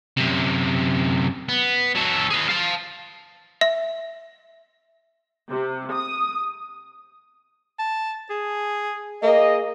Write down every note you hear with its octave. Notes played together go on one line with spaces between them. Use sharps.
F#2 C3
B3
F#3 A4
G#4 B4
F5 A5
E5
C3
D#6
A5
G#4
A#3 G#4 A#4 D#5